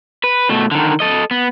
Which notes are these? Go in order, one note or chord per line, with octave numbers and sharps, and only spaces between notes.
B4
B2 A3
D3 D#3
A4 D#5
B3